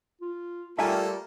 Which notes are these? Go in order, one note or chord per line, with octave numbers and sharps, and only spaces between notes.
F4
G3 A3 A#3 F4 A4 E5 G5 G#5